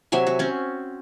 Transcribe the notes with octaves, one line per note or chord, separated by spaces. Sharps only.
C3 F#3 E5 G#5
F#4
C4 C#4